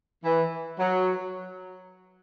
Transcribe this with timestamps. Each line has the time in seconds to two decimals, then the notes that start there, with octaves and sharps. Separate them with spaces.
0.25 E3
0.79 F#3